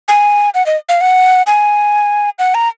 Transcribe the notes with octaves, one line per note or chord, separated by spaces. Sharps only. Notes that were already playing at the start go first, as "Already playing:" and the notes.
G#5
F#5
D#5
F5
F#5
G#5
F#5
A#5